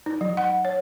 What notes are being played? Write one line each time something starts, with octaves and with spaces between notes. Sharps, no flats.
D#4
F#3
F#5
C#5